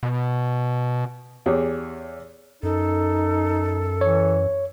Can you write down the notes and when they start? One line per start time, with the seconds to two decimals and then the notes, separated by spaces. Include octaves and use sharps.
0.03 B2
1.46 E2 G4 G#4 C#5
2.63 F#2 D#4 A4
4.01 E3 C#5